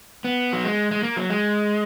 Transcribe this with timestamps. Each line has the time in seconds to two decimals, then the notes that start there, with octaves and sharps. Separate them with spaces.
0.24 B3
0.53 F#3
0.64 G#3
0.91 G#3
1.03 A#3
1.16 F#3
1.30 G#3